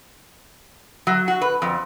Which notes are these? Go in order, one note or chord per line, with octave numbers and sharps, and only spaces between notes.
F#3
F#4
B4
F2